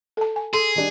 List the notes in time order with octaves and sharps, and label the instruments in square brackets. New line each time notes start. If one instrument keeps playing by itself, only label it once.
[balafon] A4 A5
G#5
[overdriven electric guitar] G#4 [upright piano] A4 [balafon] C6
[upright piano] D#3 G3 D4